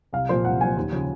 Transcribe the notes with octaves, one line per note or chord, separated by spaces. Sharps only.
C2 F5
A#2 F3 C5
C2 F#5
A#2 F3 G#5
D#2
C#3 F3